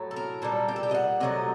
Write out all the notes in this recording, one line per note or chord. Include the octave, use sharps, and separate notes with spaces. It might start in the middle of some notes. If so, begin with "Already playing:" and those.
Already playing: A2 F#3 A3
A4
A#4
A#2 G3 A4
G4
A4
G4
D#5
F#5
C3 F#3 A3 D#5